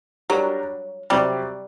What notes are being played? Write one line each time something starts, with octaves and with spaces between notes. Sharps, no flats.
F#3 G3 D4 F#4 A#4
C3 F#3 G3 C4 G4 D5